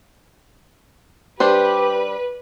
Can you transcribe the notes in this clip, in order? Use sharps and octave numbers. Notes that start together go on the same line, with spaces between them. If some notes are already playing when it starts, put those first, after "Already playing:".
G3 D4 G4 B4 C5